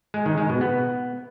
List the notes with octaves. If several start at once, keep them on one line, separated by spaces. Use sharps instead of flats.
G#3
D#3
G#3
B2
B3